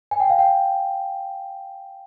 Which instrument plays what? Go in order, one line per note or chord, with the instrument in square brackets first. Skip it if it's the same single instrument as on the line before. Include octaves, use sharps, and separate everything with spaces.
[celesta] G#5
G5
F5
G5